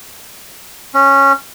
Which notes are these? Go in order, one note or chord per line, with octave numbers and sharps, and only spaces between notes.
C#4